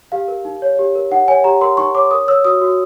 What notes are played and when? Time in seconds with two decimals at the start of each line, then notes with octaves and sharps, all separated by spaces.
0.12 G4 F5
0.28 A#4
0.45 D#4
0.62 C#5
0.79 G4
0.95 A#4
1.11 D#4 F#5
1.28 C#5 G#5
1.44 G4 A#5
1.61 A#4 C6
1.77 D#4 C#6
1.95 C#5 D6
2.11 A#4 D#6
2.27 C#5 E6
2.45 F#4 D#6
2.61 F#4